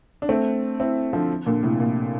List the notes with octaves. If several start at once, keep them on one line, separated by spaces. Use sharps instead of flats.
D4
A3 C4
C4 E4
D3 F3
A#2 D3
A2 C3
A#2